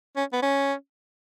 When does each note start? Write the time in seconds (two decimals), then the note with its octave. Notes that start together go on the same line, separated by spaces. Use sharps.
0.16 C#4
0.33 B3
0.42 C#4